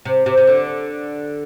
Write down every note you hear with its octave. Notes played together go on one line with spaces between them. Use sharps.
C3
C3
C3
D3